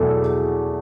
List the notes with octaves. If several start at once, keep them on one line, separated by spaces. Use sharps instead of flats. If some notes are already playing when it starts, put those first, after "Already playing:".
Already playing: E2 B2 F#3 A3 A4